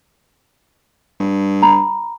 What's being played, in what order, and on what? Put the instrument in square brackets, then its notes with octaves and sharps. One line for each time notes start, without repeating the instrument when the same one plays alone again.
[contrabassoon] G2
[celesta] A#5 B5